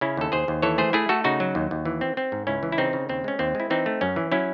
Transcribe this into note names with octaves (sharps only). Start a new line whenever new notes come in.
C#3 C#4 E4
D#2 A4
D#2 G#4 C5
D#2
E3 A4 C#5
A3 G#4 C5
A3 E4 G#4
A3 F#4 A4
C#3 D#4 F#4
F#3
D#2
D#2
E3
C4
C4
G#2
C#2 C#4 E4
E3
E4
C#3 C4 D#4
C#3
D#2 C4
G#3 C#4
D#2 C4
G#3 E4
E3 C4 D#4
A3
F#2 C#4
E3
F#3 C#4 E4